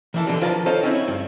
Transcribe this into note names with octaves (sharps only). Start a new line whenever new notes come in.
D#3 E3 A5
B2 D3 E3 G3
D#3 F3 F4 B4 A5 A#5
D#4 F4 A4 C5 C#5
C4 C#4 D#4 E4
G2